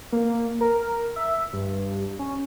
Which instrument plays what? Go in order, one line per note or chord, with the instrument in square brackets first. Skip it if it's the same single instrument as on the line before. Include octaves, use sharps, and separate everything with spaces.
[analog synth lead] A#3
A#4
E5
G2
C#4